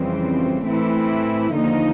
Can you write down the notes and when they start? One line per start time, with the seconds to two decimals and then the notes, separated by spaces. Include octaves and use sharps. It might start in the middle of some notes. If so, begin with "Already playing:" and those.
Already playing: F2 C#3 E3 G3 C4
0.65 A2 E3 A3 C4 E4
1.54 D#2 D3 F3 A#3 D#4